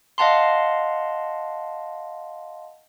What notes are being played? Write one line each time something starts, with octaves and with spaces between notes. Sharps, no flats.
D#5 F5 F#5 A5 A#5 C6